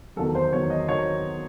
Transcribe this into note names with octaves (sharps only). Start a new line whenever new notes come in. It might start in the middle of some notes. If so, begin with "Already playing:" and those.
E2 D#3 F#3 A4
C5
E2 D#3 F#3 C#5
D#5
D#3 F#3 C#5